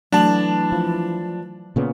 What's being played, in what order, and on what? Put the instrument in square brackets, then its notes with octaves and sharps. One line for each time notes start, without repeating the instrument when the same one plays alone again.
[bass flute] E3 [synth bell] F#3 A3 F#7 [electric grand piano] D4 A5
[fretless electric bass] F3
A#2 C#3 B3